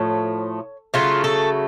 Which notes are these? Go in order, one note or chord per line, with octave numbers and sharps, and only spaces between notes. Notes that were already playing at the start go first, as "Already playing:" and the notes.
Already playing: A2 F3 A3 C#5
C#3 F#3 A3 F4
A4